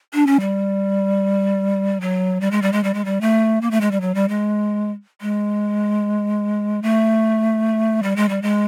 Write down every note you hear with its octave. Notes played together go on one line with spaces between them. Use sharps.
D4
C#4
G3
F#3
G3
G#3
G3
G#3
G3
G#3
G3
A3
A#3
A3
G#3
G3
F#3
G3
G#3
G#3
A3
G3
G#3
G3
G#3